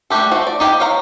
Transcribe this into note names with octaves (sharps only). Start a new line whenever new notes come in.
G3 A3 F#4 G4 A4
F3 A3 F#4
D5
D#4 G4 B4 F5 G5
E4 C#5 F5 G5 A#5